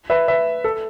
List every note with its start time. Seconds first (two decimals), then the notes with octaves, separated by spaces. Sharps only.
0.10 B4 E5
0.28 B4 E5
0.64 A4